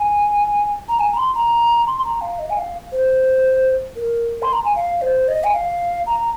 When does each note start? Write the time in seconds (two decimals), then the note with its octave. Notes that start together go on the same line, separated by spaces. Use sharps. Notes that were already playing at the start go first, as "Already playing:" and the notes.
Already playing: G#5
0.89 A#5
0.99 G#5
1.13 A#5
1.17 C6
1.34 A#5
1.87 C6
1.99 C6
2.05 A#5
2.21 F5
2.39 D#5
2.50 G#5
2.57 F5
2.92 C5
3.96 A#4
4.42 C6
4.53 A#5
4.64 G#5
4.76 F5
5.02 C5
5.28 D#5
5.44 G#5
5.54 F5
6.06 A#5